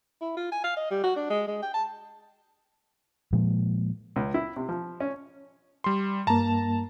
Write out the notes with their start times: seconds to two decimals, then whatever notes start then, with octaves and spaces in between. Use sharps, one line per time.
0.21 E4
0.37 F4
0.52 G#5
0.64 F5
0.77 D#5
0.91 G3
1.03 F#4
1.16 D4
1.30 G#3
1.47 G#3
1.62 G5
1.74 A5
3.33 A#2 F3 G#3
4.16 C#2
4.34 E4
4.56 C3
4.69 F3
5.00 C#4
5.84 G3 C6
6.27 G2 A#3 A5 A#5